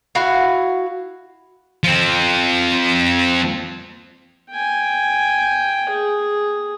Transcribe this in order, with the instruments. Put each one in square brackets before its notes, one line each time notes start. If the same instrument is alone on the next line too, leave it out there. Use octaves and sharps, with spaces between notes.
[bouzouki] E4 F#4 F5
[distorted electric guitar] F3 C4
[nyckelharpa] G5 G#5
G#4